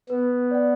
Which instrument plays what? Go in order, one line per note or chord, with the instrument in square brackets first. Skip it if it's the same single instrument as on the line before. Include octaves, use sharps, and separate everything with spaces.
[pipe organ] B3 [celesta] B4
[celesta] D5 F#5